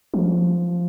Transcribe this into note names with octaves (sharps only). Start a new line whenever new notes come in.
F3